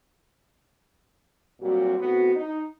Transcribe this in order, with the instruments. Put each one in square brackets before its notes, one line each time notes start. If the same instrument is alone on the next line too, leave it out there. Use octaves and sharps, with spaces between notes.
[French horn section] A#2 F#3 G3 C4 F#4
A2 B3 C4 F#4
D#4